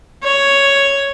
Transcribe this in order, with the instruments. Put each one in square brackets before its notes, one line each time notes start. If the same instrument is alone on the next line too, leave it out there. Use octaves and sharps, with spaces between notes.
[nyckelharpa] C#5